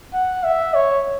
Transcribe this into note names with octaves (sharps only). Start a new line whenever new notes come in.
F#5
E5
C#5